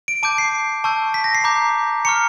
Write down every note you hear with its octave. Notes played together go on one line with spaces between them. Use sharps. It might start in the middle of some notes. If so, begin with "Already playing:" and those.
D7
A5 D6 G6 D7
C7
A5 C#6 E6 G6
B6
A#6
C7
A#5 D6 G6
A#5 C#6 F6 C#7